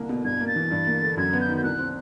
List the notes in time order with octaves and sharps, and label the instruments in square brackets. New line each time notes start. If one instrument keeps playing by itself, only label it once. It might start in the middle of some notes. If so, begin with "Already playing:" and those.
Already playing: [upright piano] C2 D3 A#3
B2
[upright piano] G2 [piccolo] G#6
[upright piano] A#3
[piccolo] A6
[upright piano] E3
G2
A#3
D3
[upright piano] F#2 [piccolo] G#6
[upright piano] B3
[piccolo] G6
[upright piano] D#3
[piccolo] G6
[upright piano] C2 [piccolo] F#6
[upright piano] C4